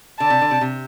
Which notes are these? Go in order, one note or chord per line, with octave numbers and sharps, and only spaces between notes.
D3 A5
C3
D3
C3
C3